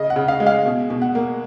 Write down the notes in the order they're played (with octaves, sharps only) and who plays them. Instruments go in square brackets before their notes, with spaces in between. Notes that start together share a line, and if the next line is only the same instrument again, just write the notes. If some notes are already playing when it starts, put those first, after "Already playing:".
Already playing: [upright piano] C#3 D#5
F#5
C#3
F5
G#3
F5
B2
B2
F#5
A#3